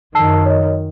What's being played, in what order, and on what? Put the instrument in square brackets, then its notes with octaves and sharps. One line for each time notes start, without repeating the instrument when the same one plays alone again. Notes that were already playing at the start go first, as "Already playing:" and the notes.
[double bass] F#2 D#3 [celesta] A5 E6 C7
[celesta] C#5 D#5